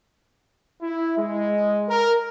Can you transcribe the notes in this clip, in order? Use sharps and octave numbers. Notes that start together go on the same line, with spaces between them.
E4
G#3
A#4